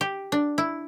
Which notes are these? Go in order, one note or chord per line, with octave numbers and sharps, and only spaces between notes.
G4
D4
E4